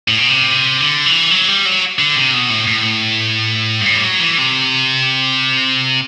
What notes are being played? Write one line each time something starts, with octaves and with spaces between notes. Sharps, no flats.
A2
B2
C3
D3
E3
F#3
G3
F#3
D3
C3
B2
A2
A2
G2
A2
G3
F#3
E3
C3